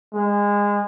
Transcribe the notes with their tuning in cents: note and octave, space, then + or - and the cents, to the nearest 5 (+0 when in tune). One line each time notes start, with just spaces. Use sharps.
G#3 -25